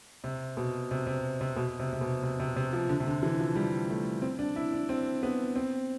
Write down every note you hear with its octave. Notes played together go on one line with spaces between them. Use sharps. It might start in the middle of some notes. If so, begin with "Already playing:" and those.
C3
B2
C3
C3
C3
B2
C3
C3
B2
C3
C3
C3
F3
D3
C3
D3
E3
F3
G3
A3
C4
D4
E4
D4
C4
B3
C4